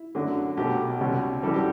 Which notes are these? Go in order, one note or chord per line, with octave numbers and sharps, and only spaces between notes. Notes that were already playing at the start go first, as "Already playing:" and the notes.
Already playing: E4
F#2 D3 F#3 A3
B1 B2 A3 G4
C#2 B2 G3
F#2 E3 G3 A4
G4